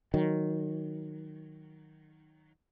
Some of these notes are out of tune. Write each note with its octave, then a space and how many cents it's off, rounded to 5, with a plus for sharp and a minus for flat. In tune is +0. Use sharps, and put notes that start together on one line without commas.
D#3 +0 F#3 +0